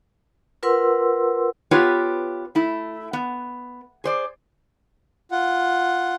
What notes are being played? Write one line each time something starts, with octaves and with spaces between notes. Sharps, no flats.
F4 A#4 B4 F#5 C6 E6
B3 F4 G4 B4 C#5
A3 E4
B3
G#4 C5 D5
F4 F#5